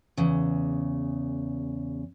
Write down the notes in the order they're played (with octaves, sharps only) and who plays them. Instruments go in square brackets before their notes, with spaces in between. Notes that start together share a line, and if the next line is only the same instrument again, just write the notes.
[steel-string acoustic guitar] E2 C#3